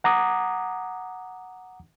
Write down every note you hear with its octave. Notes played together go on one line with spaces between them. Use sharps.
F#5 A#5 D6 D#6